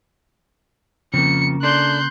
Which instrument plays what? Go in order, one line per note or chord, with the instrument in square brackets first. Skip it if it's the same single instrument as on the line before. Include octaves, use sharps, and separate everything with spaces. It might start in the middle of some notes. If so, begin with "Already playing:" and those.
[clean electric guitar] F2 F3 C4 [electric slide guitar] C#3 A#3 [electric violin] C#7
[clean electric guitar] D4 A4 D5 [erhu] C6 [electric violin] F#6 G6